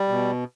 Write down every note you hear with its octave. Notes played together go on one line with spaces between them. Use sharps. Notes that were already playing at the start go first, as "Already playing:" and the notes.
Already playing: G3
B2